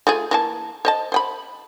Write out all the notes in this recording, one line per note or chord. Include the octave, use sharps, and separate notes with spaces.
A3 F4 G#4
E3 A#3 A5
C5 D#5 A5
C5 G5 B5